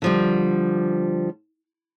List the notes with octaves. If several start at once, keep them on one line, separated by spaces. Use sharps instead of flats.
D3 F3 G3